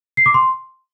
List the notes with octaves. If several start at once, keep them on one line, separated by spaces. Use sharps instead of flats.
C7
D6
C6